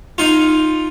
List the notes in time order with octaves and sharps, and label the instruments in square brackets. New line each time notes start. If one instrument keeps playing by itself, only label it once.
[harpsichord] D#4 F4